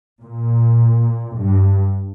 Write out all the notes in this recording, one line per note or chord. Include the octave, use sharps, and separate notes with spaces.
A#2
G2